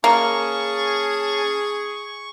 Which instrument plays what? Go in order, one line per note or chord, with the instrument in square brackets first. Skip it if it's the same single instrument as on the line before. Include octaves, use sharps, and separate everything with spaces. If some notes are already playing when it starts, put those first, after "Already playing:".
[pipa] A#3 [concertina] C#4 A5 [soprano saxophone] G#4 [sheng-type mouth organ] C#6